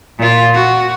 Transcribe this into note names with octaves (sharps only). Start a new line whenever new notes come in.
A#2 F4
F#4